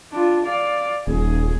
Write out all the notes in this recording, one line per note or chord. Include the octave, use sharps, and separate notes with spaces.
D4 F4
D5 F5
D#1 G#4